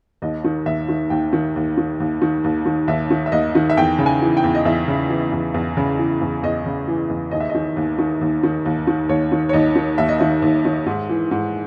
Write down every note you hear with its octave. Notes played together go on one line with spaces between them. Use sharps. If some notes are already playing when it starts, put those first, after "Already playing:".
D#2 D#5
D#3
D#2 E5
D#3
D#2 G5
D#3
D#2
D#3
D#2
D#3
D#2
D#3
D#2 E5
D#3
E5
D#2 D#5
D#3
E5
E2 G5
C#3
G#5
E3
G5
E2
D#5
E2 E5
C#3
E3
E2
E2
C#3
E3
E2
E2 D#5
C#3
E3
E2
D#2 D#5
E5
D#3 D#5
D#2
D#3
D#2
D#3
D#2
D#3
D#2 C#5
D#3
C#5
D#2 D#5
D#3
D#2 E5
D#5
D#3 E5
D#2
D#3
G#2
E3
G#2